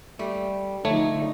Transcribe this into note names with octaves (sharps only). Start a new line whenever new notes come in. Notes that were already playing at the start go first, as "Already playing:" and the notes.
G3 A3
D3 F3 A3 D#4 C#5